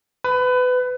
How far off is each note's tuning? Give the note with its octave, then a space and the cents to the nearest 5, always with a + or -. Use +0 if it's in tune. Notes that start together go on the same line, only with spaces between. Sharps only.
B4 +25